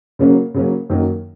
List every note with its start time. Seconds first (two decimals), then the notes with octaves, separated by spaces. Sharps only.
0.19 C#3 F#3 A#3 C#4
0.54 C#3 F#3 A#3 C#4
0.90 F#2 D#3 F#3 A#3